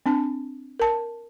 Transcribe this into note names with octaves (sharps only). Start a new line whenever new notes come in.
C4 D4 A5
A#4 A5